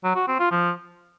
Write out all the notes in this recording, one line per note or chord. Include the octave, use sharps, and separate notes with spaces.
F#3
F#4
C4
F4
F3